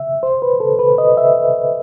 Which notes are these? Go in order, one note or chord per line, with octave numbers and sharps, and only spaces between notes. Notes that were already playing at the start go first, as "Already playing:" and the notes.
Already playing: E5
C5
B4
A4
B4
D#5
E5